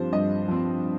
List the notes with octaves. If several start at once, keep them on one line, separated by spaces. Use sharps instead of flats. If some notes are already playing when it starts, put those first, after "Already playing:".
Already playing: G2 F3 C4 C5
G2 D#5
F3 C4